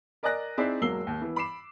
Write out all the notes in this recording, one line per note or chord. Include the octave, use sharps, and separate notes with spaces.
A#4 D5 D#5 G#5 F#6 A#6
C4 D#4 E4 G#4 D5 E5
E1 F#3 A#3 E6 C7 G7
D#2
E3 B3
B5 D6 C7 E7